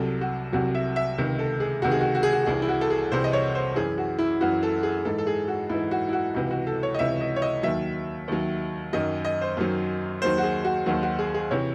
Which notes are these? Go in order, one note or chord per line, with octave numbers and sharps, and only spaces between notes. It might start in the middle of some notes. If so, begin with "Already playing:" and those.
Already playing: C2 C3 F#3 A4
F#4
C2 C3 F#3 F#4
E5
E5
C#2 C3 D#3
A4
G#4
C#2 C3 D#3 F#4
G#4
F#4
F#4
G#4
F#4
F#4
C2 C3 E3 G#4
E4
F#4
A4
G#4
C2 C3 E3 C5
D#5
C#5
C5
F#2 E3 G#4
F#4
E4
F#2 E3 F#4
A4
G#4
G#2 E3 A4
A4
G#4
F#4
G#2 E3 E4
F#4
E4
F#4
C#2 C3 E3 F#4
F#4
A4
C#5
D#5
C#2 C3 E3 E5
D#5
C#5
D#5
D#2 D#3 F#3 E5
D#2 D#3 F#3
F#2 D#3 F#3 D#5
D#5
C5
F#2 D#3 F#3
D#2 D#3 F#3 C5
F#4
G#4
F#4
D#2 D#3 F#3 F#4
F#4
G#4
G#4
C3 E3 C#5